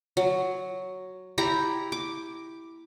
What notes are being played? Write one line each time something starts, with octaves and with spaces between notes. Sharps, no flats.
F#3
E4 G4 A#5
D6